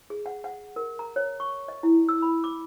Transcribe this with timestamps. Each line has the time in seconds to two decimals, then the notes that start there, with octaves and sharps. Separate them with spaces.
0.10 G#4
0.26 F#5
0.44 F#5
0.76 A#4
0.99 A#5
1.16 C#5
1.40 C#6
1.68 D#5
1.83 E4
2.09 E6
2.22 B5
2.44 D6